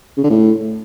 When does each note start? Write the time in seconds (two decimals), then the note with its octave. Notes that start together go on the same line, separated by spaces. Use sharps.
0.17 C#3
0.24 D3
0.30 A2